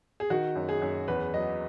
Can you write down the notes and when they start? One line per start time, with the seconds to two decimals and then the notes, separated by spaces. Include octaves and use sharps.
0.20 G#4
0.30 D#3 F#4
0.55 F#2
0.69 G#4
0.82 F#2
1.08 E2 B4
1.33 F#3 D#5